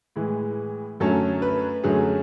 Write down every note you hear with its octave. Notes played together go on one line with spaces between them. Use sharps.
A2 E3 G#3
F#2 D3 F#3 A3 C#4 A4
B4
F#2 D3 F#3 A3 C#4 G#4